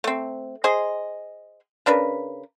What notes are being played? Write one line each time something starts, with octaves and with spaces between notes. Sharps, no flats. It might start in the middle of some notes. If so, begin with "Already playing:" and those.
A3 C4
G#4 C5 D#5
C#3 D4 A#4 B4